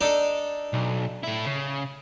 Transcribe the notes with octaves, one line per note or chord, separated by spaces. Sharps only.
D4 D#4 A4
B1
A3 E4
C#3